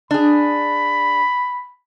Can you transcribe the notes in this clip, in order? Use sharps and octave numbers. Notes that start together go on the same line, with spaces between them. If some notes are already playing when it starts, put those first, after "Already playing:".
D4 G#4 B5